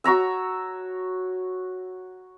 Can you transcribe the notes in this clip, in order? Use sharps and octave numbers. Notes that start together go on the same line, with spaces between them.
F#4 C#5 A#5 E6